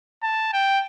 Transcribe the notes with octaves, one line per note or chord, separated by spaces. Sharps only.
A5
G5